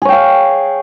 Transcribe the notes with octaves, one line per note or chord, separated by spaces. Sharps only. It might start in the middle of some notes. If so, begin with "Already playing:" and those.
G#4 C#5 F5 G5